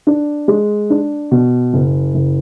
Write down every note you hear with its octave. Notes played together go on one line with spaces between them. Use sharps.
D4
G#3
D4
B2
F#1
F#1